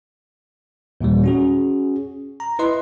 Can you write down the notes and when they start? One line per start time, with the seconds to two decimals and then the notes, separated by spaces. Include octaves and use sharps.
1.01 D#2 A#2 E3 G3
1.24 C#4 F#4 G#4
2.40 A#5
2.59 E4 B4 D#5 C6